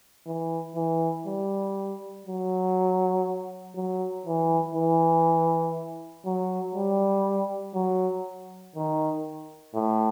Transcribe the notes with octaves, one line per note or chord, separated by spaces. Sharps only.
E3
E3
G3
F#3
F#3
E3
E3
F#3
G3
F#3
D#3
A2